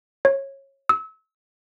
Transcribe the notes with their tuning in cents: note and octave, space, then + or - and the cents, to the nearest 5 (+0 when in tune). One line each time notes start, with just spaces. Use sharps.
C#5 -20
E6 -30